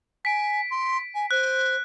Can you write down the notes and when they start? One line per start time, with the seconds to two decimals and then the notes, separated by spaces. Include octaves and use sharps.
0.25 G#5 B6 D7
0.70 C6
1.14 G#5
1.31 C5 F#6